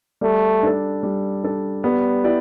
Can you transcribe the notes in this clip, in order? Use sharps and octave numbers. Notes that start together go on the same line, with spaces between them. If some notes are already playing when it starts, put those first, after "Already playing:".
G3 A3
D4 A4
G3
D4 A4
G3 B3
E4 G4 D5